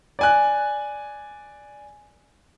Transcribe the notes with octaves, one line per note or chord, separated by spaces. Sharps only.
D5 G#5 F#6